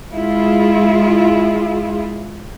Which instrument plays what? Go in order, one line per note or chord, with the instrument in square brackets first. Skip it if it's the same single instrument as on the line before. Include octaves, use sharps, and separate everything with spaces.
[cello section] G#3 E4 F4 G#4